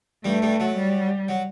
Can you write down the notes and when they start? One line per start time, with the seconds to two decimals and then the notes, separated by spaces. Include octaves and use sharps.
0.25 G2 G3 A3
0.42 G2 G3
0.60 F#3
0.77 G3
1.28 F#3